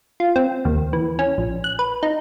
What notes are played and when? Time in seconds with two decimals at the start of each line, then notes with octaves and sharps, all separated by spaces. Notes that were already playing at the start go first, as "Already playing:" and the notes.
0.20 F4
0.36 C4
0.65 D#2
0.93 E3
1.19 C#4
1.38 A#1
1.64 F#6
1.79 B4
2.03 D#4